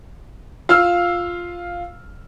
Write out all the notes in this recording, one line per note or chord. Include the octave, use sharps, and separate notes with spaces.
F4 F5 E6 F6